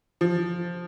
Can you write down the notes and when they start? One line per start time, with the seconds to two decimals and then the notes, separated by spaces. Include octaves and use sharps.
0.21 F3